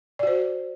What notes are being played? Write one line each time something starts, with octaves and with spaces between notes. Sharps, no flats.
F#4 C5 D5